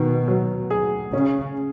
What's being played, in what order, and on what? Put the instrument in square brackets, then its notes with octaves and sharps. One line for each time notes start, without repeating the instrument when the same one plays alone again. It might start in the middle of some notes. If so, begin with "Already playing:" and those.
Already playing: [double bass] B2 [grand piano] D#3
[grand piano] F#3
G#4
[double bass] C#3 [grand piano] C#4